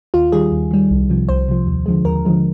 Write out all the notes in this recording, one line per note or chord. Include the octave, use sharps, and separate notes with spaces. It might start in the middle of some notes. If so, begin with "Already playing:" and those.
D#2 F4
D#3 G3 G#4
D#2
D#3 G3
C2
C3 F3
C2 C5
C3 F3
D#2
D3 F3 G#3
D#2 A#4
D3 F3 G#3